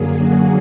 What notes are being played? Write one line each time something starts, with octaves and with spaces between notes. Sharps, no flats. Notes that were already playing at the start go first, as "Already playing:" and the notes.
Already playing: F#2 D3 F#3 A#3 G#4
F#4